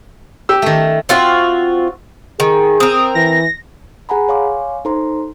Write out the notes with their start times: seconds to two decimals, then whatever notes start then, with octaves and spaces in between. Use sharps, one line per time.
0.49 G4 E6
0.62 D#3 A3
1.09 C4 F4 F#4 E5
2.40 D#3 G#4
2.80 C4 A#4 D#6
3.15 E3 A#6
4.09 G#4 F#5 G#5 A#5 B5
4.29 C#5 F5 G#5 C6 D6
4.85 D#4 A4 C5 A#5 C6